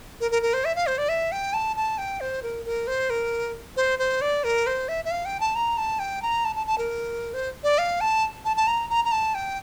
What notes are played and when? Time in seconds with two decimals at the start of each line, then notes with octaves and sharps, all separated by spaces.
0.20 A#4
0.31 A#4
0.42 A#4
0.53 C5
0.65 E5
0.75 F5
0.87 C5
0.98 D5
1.09 E5
1.32 G5
1.53 A5
1.76 A5
1.98 G5
2.21 C5
2.43 A#4
2.66 A#4
2.87 C5
3.10 A#4
3.77 C5
3.99 C5
4.21 D5
4.44 A#4
4.67 C5
4.88 E5
5.05 E5
5.11 F5
5.25 G5
5.40 A5
5.55 A#5
5.77 A5
5.99 G5
6.22 A#5
6.45 A5
6.55 A5
6.67 A5
6.78 A#4
7.34 C5
7.64 D5
7.78 F5
8.01 A5
8.45 A5
8.56 A5
8.67 A#5
8.90 A#5
9.05 A#5
9.12 A5
9.35 G5